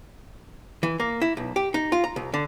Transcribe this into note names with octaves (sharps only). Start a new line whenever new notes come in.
E3
A#3
E4
B1
G4
D#4
F4
A#5
C2
D3